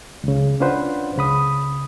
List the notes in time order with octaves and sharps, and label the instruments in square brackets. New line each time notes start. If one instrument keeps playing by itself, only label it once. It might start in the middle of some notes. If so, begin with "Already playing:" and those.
[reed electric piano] C#2 C#3
C#4 D4 F4 B4 C5 F#5
C#2 C#3 B5 D#6